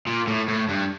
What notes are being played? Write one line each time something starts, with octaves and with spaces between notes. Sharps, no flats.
A#2
A2
A2
G2